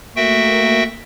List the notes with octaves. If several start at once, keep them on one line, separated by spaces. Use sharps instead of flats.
A3 A#3 F#4 E5 G5